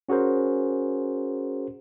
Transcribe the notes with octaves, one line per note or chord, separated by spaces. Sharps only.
C#4 F#4 G#4 A#4 C5